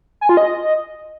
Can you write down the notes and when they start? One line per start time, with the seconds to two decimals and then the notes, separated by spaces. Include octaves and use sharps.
0.21 G#5
0.29 F4
0.37 D#5